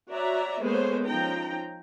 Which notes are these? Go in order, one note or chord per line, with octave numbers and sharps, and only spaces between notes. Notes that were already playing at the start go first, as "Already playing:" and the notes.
F#4 C#5 D5 E5 A#5
G#3 A#3 B3 A4 C5 C#5
F3 C#4 D#4 G5 A#5